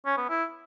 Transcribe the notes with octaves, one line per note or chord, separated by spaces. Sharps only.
C#4
B3
E4